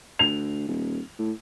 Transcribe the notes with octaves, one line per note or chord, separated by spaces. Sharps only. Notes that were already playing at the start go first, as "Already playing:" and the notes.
D2 F7
D#1
A2